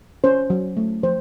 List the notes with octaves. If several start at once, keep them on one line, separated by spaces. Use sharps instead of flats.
C#4 C5
F#3
A3
F3 C5